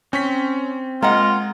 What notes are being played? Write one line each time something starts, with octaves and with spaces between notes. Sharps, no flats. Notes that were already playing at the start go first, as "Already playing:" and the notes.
C4 C#4 C#6 B6
G#3 A#3 F4 D#5 F#5